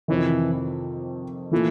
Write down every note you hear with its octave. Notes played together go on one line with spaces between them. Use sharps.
F2 C3 D#3 E3
A#2 E3 F3 A3